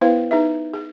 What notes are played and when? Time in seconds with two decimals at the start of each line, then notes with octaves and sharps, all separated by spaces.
0.01 B3 E4 B4 C5 F5
0.31 D#4 G#4 B4 E5
0.74 G#4